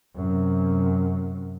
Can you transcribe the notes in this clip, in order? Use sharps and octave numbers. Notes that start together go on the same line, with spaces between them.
F#2 C3